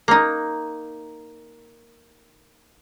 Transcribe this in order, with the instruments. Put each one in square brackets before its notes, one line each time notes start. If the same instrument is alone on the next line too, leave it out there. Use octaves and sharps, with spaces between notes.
[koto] A#3 D#4